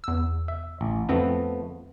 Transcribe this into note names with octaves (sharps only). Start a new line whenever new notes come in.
E2 E6
E5
A1
F2 F3 A3 B3 C4